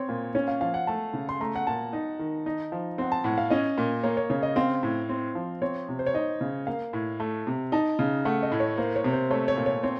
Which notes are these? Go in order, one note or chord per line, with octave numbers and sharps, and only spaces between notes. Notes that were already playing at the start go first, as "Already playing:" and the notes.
Already playing: C4 C#5
A#2
C#4 C#5
F5
F3 F5
F#5
A3 A5
C#3
C6
A3 A#5
F#5
A#2 A5
D#4
D#3
D#4
F3
C4 F#5
A5
A2 F#5
F5
C#4 D#5
A#2
A#3 C#5
C#5
C#3 C#5
D#5
C4 F5
A2
C4
F3
C4 C#5
C3
C5
C#5
D#4 D#5
C#3
A#3 F5
A2
A3
C3
D#4 A5
C#3
A3 F#5
D#5
A2
C#5
A#3 C5
C#5
C3
C5
A3 C#5
C#5
A#2
C#5
C4 C#5